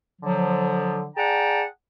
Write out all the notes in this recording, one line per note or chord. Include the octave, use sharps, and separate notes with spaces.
D3 F3 F#3
G#4 D5 F#5 G5 A5 A#5